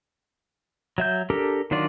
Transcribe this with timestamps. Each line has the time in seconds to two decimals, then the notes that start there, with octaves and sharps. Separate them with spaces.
0.98 F#3 E5 G6
1.30 D4 G4 A4 A#4
1.71 D#3 F#3 D4 F4 D5